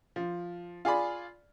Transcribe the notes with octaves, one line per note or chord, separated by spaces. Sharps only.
F3
F4 G#4 D5 B5